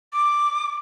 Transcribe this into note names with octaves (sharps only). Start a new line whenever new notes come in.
D6